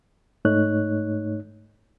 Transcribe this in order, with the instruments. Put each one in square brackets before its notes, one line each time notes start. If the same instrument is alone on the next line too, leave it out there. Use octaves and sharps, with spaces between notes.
[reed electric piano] G#2 A3 D#4 C#5 F#6